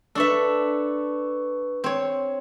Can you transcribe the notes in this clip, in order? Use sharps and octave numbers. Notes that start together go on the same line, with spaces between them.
D4 A4 B4 E5 C#6 E6
C4 C#5